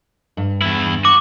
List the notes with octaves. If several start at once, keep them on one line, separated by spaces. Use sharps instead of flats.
G2
E2 E4
F#4 D6